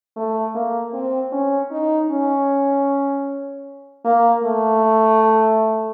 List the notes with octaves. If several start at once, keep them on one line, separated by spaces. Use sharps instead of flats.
A3
A#3
C4
C#4
D#4
C#4
A#3
A3